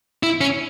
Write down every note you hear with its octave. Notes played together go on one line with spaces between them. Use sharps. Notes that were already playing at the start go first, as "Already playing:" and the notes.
E4
C#4